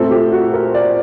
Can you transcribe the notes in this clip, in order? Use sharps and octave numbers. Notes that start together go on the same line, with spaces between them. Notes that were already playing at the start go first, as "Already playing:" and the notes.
Already playing: A#2 A3 C4 A4
G4
F#4
A#4
D5